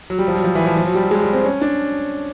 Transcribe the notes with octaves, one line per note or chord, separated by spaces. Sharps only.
F#3
G3
F3
F#3
F3
E3
F3
F3
F#3
G3
F#3
G#3
G3
C4
C#4
D4